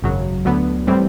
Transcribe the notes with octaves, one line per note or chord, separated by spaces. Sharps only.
G#1 F#2 C#3 F#3
D2 D3 F#3 B3
A2 E3 G3 C4